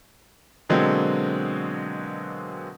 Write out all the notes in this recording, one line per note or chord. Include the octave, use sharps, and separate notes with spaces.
B2 D3 F#3 G#3 A#3 C4